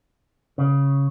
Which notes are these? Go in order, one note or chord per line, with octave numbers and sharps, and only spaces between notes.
C#3